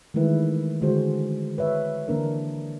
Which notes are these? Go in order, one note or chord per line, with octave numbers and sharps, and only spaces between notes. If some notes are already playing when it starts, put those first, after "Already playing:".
D#3 E3 G#3 A3 E4 B4
D3 G#3 F#4 C5
B4 C#5 E5
D3 E3 A#3 D4 A#4